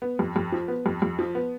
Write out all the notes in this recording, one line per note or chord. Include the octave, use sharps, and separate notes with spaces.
B3
F2
F2
F3
B3
F2
F2
F3
B3